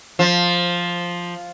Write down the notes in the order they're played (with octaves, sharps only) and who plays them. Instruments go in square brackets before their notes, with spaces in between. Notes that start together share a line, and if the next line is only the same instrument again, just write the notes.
[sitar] F3